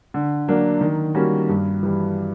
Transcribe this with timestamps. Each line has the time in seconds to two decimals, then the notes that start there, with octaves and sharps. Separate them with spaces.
0.14 D3
0.48 F#3 A#3 D4
0.81 D#3
1.15 G3 A#3 C#4 F#4
1.49 G2
1.83 E3 G3